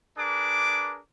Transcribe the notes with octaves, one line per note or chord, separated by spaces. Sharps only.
D4 G#4 A#4 B4 D6